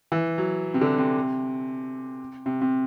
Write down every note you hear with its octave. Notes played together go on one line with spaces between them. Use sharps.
E3
F#3
C3
D3
C3
C3
C3